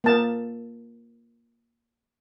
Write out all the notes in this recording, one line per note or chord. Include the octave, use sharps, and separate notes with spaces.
A#3 A5